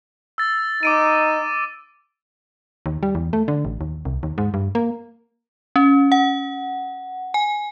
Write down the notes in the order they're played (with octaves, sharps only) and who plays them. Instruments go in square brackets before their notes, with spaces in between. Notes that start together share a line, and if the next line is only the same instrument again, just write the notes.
[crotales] E6 A6
[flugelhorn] D#4 [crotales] D6 D7 D#7
[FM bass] D#2
G3
E2
A3
D3
A1
D#2
C2
D#2
G#2
G2
A#3
[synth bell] C#4
F#5
G#5